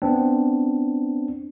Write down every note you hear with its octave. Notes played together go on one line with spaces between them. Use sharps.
B3 C4 D4